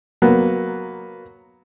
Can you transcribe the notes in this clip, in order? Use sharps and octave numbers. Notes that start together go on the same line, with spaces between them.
F#3 A#3 B3